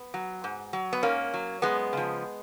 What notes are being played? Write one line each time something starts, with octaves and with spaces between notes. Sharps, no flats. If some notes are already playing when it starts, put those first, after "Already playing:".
Already playing: B3
F#3
G#2
F#3
B3
G#2 A#3 C#4
F#3
F#2 G#3 B3
C#3 F3